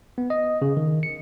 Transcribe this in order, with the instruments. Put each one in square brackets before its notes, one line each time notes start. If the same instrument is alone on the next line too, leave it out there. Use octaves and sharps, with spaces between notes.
[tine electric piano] B3
D#5
C#3
D#3
C#7